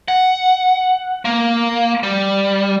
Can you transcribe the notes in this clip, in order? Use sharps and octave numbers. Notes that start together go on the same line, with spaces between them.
F#5
A#3
G3